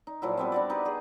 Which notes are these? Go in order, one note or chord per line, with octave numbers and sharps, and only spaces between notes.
D#4
A#2 F3 F#3 E4
G3 B3 C4
D4 F#4 D5
D#4 G4 B4
G#4 D5